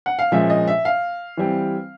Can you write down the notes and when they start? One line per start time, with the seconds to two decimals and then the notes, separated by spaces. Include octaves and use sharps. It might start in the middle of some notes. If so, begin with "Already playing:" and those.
0.06 F#5
0.19 F5
0.32 A#2 F3 G#3 C#4 E5
0.50 D#5
0.68 E5
0.85 F5
1.37 E3 G3 C4